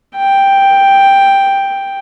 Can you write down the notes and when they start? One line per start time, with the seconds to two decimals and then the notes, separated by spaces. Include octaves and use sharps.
0.17 G5